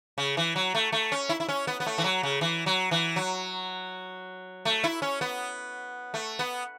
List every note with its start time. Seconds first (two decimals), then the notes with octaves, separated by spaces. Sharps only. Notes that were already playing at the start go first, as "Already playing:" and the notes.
0.18 C#3
0.37 E3
0.56 F#3
0.75 A3
0.92 A3
1.12 C#4
1.29 E4
1.40 E4
1.49 C#4
1.67 B3
1.80 B3
1.86 A3
1.98 E3
2.04 F#3
2.23 C#3
2.41 E3
2.66 F#3
2.91 E3
3.16 F#3
4.65 A3
4.84 E4
5.02 C#4
5.21 B3
6.14 A3
6.39 B3